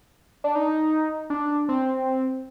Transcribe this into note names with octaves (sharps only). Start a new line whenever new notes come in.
D4
D#4
D4
C4